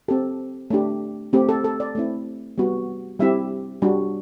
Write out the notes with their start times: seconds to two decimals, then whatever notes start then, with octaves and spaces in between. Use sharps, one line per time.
0.08 C4 G4 A4
0.70 A3 D4 G4
1.33 A3 C4 G4
1.49 A4
1.64 A4
1.80 D5
1.95 A3 C4 E4
2.58 G3 B3 F#4
3.20 G3 C4 E4 G4 E5
3.82 G3 D4 F#4